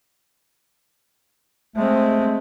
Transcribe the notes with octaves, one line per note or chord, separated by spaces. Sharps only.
G#3 A3 C4